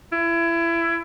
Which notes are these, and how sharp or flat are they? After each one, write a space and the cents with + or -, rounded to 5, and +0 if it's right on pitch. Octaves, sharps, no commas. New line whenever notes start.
E4 +25